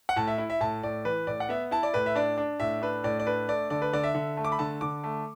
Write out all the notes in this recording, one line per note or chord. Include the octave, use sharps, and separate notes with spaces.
F#5
A2 A5
E5
E4
E5
A2 A5
A2 D5
E3 B4
A2 D5
F#5
B3 E5
E4 A5
D5
A2 B4
E5
D4 D5
D4
A2 E5
D4 B4
A2 D5
D5
D4 B4
A3 D5
D3 D5
B4
D3 D5
E5
D3
A3
D6
B5
D3 A5
D3 D6
A3